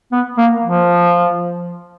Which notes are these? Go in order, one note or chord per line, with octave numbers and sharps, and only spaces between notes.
B3
A#3
F3